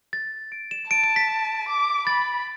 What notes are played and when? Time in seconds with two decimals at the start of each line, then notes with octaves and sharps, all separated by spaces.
0.13 A6
0.52 D7
0.71 E7
0.91 A5 D7
1.04 D7
1.16 B6
1.68 D6
2.07 B5 A6